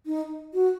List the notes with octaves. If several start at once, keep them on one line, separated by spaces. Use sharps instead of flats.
D#4
F#4